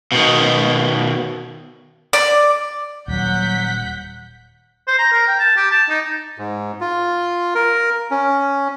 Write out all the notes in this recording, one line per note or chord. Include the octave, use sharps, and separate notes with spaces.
B2 D#3
D5
D#1 F#3 F#5 G6 B6
C5
A#5
A#4
G5
A5
G4
A5
D#4
G#2
F4
A#4
C#4